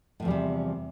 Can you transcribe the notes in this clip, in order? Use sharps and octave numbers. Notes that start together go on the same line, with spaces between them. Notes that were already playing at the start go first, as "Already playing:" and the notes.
E2 A2 C3 F3 G3